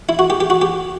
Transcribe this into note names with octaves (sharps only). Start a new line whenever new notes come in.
E4
F#4
G4
G4
F#4
G4